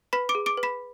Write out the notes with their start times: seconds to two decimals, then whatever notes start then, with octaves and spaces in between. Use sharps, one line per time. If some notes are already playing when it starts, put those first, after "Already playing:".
0.13 B4 B5 B6
0.29 D6 D7
0.35 G#4
0.46 D6 D7
0.57 B4
0.63 B5 B6